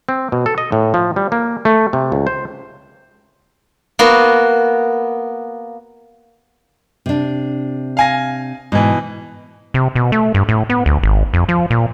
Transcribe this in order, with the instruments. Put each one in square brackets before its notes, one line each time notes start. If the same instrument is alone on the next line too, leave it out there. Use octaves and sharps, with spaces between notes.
[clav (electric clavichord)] C4
B2
A4
D#5
A2
F3
G3
A#3
A3
C3
C#2
C5
[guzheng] A#3 B3 F#4
[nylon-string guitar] C3 D4
[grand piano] F5 G#5 A#6
[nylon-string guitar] G#2 [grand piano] B2 E3
[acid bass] C3
B2
A3
G2
A2
B3
D2
G#1
F2
F3
A#2